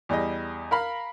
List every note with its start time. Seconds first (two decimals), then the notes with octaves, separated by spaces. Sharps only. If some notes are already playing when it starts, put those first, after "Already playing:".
0.09 E2 G3 G#4 D#5
0.71 A#4 F5 B5